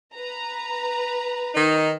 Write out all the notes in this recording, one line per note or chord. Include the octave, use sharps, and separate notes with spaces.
B4 A#5
D#3 D#4